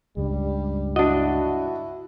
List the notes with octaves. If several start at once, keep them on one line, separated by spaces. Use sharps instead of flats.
C#2 G2 G3
D4 E4 F#4 D#5